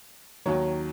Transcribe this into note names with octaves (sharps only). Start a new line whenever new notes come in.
D#2 D#3 F#3 C#5